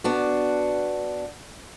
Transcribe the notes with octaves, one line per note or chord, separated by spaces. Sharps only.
B3 D4 F#4